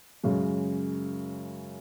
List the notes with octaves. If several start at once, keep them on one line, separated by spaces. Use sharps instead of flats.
F#2 C#3 G#3